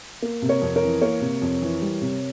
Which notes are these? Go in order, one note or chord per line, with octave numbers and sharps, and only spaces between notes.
A#3
C3
A#4 C#5
F2
A#4 C#5
E3
A#3 A#4 C#5
C3
F2
E3
G3
C3